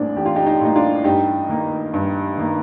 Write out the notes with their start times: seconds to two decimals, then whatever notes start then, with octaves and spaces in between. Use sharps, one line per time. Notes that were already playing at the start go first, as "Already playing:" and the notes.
Already playing: A1 A2 G3 A#3 C4 D4
0.16 A1 G4
0.26 F4
0.36 D#4 G4
0.46 D#4 G4
0.61 A2 G3 A#3 D#4
0.76 D4 F4
1.04 G2 D#4 G4
1.49 D#3 A#3
1.93 G2
2.38 D#3 A#3